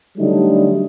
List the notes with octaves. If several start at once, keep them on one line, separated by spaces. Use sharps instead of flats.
D3 F#3 G3 A3 D#4